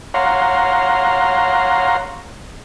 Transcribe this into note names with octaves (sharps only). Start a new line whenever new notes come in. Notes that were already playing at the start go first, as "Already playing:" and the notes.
C#5 F5 F#5 A#5 C6